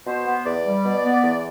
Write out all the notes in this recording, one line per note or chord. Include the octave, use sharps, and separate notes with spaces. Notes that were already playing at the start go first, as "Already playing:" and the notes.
B2 C5
B3
E2 D5
G3
B2
B3
E2